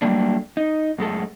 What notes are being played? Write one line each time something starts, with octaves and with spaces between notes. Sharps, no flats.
F#3 G3 A3 A#3 D4
D#4
F#2 G#3 A3 A4